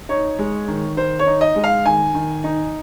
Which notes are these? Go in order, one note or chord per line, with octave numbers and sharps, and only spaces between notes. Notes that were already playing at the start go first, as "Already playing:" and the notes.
D#4 C#5
G#3
D#3
D#3 C5
C#5
D#4
D#5
G#3
F5
D#3 G#5
D#3
D#4